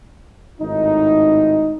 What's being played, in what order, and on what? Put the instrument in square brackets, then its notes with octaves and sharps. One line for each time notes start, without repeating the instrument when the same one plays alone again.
[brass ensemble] G#1 A2 D#4